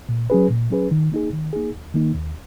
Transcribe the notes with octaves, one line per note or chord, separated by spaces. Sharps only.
A#2
F#3 C#4 G#4 B4
A#2
F#3 C#4 G#4 B4
D#3
A#3 D#4 G#4
D#3
A#3 D#4 G#4
D#2
D#3 A#3 D#4
D#2